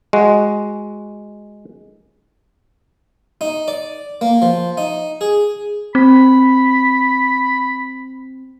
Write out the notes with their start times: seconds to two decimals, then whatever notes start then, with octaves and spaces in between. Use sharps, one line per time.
0.13 G#3 F#4
3.41 D#4
3.68 D5
4.21 A#3
4.42 F3
4.77 D#4
5.21 G#4
5.95 C4 B5